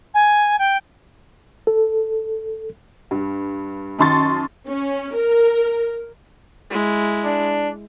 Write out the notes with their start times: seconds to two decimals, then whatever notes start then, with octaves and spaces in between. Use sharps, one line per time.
0.14 G#5
0.58 G5
1.67 A4
3.11 G2
3.99 F#2 D#3 A5 C6 C#6 A6
4.68 C#4
5.16 A#4
6.70 G#3 E4
7.25 D4